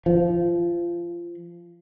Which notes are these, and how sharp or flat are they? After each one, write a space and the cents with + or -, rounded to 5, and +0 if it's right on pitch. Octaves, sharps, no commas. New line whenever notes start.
F3 -20